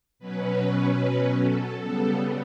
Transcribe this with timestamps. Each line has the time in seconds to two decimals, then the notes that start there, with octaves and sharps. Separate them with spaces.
0.19 B2 F#3 C#4 B4
1.39 A4
1.79 C#3 G3 B3 A4